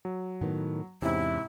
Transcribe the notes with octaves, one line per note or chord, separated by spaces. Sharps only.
F#3
A2 D#3 B3
E2 G#2 C3 C#4 E4